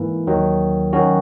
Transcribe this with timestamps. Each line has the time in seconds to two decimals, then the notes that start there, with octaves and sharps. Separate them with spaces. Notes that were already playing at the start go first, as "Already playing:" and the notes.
Already playing: G#2 E3 A#3
0.27 D#2 D#3 F#3
0.93 D#3 F#3 C#4 F#4